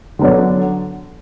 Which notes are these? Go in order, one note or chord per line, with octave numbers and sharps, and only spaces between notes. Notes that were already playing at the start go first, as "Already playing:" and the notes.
D3 F#3 B3 D4